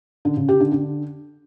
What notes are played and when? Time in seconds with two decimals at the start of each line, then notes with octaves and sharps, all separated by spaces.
0.25 D3
0.37 C#3
0.48 G4
0.60 D3
0.72 D3